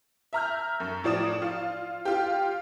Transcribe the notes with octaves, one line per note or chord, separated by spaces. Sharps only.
E5 A#5 F6 G6
F#2
A2 F3 D5 D#6 E7
F4
F4 G4